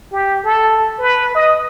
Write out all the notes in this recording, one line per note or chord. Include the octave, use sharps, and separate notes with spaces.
G4
A4
B4
D#5